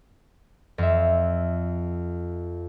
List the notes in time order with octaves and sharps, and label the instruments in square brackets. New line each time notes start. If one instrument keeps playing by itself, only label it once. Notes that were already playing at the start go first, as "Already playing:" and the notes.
[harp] F2 E5